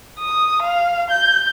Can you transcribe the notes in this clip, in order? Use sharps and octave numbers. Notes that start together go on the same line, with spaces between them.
D#6
F5
G6